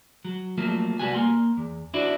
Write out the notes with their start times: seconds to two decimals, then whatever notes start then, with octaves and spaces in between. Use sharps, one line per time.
0.25 F#3
0.58 F3 F#3 A3 A#3
0.99 C2 C#3 G3 B3 F#4 G#5
1.15 A#3 C6
1.57 E2
1.94 D4 E4 F#4 C5 D5